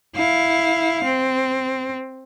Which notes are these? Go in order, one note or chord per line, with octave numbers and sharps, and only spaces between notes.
E4 F5
C4